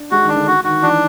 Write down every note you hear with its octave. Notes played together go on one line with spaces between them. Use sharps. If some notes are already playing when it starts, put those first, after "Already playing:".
Already playing: D4
G#3 F#4
D#3
D4
D3
F#4
D#3 F#4
E3 D4